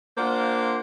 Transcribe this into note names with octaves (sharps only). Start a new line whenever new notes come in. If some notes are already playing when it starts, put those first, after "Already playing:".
A#3 D4 F4 C5 F#5